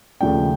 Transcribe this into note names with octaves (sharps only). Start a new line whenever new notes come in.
D#2 C#3 F3 A3 D4 G5